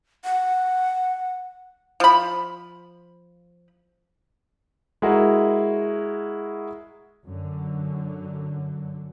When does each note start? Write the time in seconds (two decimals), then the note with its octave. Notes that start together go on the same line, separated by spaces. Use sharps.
0.24 F#5
2.00 F3 B5
5.02 G#3 E4 F#4 A#4
7.25 F#2 D3 F#3